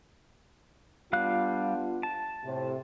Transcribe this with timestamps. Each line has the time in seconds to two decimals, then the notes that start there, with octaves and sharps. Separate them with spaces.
1.13 G3 B3 D4 F4 F5 F#6
2.03 A5
2.44 A2 C3